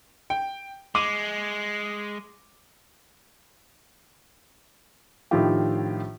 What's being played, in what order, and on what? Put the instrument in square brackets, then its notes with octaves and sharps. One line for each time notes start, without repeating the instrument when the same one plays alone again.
[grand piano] G5
[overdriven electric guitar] G#3 [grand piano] D6 D#7
[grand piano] A2 D#3 F3 D4 F4 G4